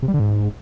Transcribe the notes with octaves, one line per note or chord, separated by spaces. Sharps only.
C3
G3
D3
G#2